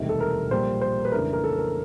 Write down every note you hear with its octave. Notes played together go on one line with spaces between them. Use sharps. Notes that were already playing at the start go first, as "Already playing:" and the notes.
Already playing: E1 D2 C3 D#3 G3
A4
A#4
A#1 A#2 G3 A#3 C5
C5
B4
F2 C#3 E3 A3 D4 A#4
A#4
A4
A#4